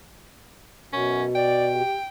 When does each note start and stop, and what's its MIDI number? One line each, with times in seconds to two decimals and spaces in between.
0.93 1.28 42
0.93 1.82 47
0.93 1.23 61
1.35 1.70 74
1.35 2.08 79
1.75 1.98 67